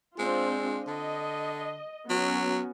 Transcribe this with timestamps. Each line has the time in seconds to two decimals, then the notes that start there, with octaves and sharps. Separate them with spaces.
0.19 G#3 C4 D4 F4
0.88 D3 D#5
2.10 F#3 B3 C#4 F#4